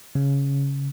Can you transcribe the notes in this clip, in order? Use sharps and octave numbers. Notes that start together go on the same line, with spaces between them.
C#3